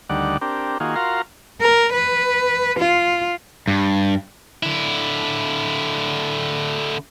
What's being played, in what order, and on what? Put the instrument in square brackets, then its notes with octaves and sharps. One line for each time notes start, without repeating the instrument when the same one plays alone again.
[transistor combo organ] D2 D#3 G3 D5 F#5
C4 D4 G4 A#4
D#3 A#3 F4 F#4 G#4
F4 F#4 A#4 F5 A#5 C6
[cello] A#4
B4
F4
[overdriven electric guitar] G2
[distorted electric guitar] D3 E4